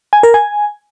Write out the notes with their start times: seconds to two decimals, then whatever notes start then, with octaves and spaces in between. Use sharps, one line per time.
0.13 G#5
0.23 A#4
0.34 G#5